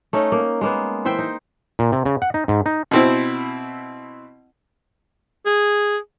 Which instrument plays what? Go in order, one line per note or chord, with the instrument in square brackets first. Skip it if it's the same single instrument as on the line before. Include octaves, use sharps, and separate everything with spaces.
[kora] A3 C#4 D#4
A#3
G#3 A#3 B3
E3 C5 E5 G5
D#4
[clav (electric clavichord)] A#2
C3
C#3
F#5
D#4
G#2
D#4
[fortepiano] B2 C4 E4
[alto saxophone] G#4